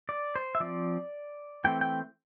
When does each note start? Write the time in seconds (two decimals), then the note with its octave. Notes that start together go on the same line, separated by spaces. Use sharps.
0.09 D5
0.36 C5
0.55 E5
0.60 F3 C4 D5
1.64 E3 A3 C4 G5
1.81 G5